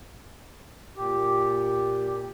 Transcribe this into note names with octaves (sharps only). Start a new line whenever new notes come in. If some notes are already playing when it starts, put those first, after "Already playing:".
A#2 G4